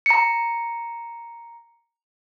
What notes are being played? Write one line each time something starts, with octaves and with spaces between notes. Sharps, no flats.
A#5 C#7